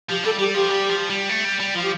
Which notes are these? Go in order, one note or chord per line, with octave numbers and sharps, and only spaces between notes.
F3 G4
G3 A4
G3 G4
F3 G4
G3
F3
G3
A3
G3
G3
F3 F4
G4